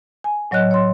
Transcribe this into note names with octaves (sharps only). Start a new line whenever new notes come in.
G#5
A2 F#3 C#5 D#5 F#6
C#5 C6